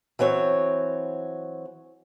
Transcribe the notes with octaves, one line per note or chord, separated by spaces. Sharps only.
E3 F#3 C4 C#5